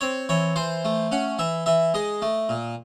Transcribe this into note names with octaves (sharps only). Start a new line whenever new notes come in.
C4 C#5
E3 C#5
E3 C5
A3
C#4 F#5
E3 E5
E3 E5
G#3 D#5
A3
A#2